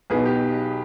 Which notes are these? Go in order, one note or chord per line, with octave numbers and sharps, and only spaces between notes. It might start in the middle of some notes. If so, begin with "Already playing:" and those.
B1 B2 B3 D#4 G#4
G4